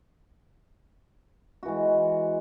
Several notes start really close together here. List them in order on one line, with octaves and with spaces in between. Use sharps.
F#4 E3 G#3